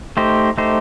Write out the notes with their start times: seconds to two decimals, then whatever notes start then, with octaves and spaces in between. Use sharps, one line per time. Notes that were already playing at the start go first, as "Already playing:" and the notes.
0.17 A3 D#4 G4 C5
0.57 A3 D#4 G4 C5